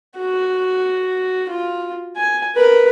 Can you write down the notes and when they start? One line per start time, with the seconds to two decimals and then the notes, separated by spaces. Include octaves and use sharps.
0.16 F#4
1.49 F4
2.16 G#5
2.55 A#4 B4